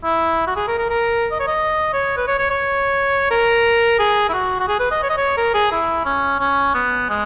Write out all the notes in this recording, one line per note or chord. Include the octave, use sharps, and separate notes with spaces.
E4
F#4
G#4
A#4
A#4
A#4
D#5
C#5
D#5
C#5
B4
C#5
C#5
C#5
A#4
G#4
E4
F#4
F#4
G#4
B4
D#5
C#5
D#5
C#5
A#4
G#4
E4
C#4
C#4
B3
G#3